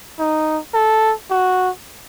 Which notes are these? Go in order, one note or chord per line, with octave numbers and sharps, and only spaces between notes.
D#4
A4
F#4